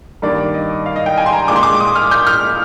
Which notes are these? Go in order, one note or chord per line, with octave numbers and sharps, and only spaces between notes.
G2 D#3 A#3 D4 D5
D#5
F5
D#5
G5
G#5
C6
A#5
A#2 G#3 D4 D6
C6
D6
D#6
F6
G6
F6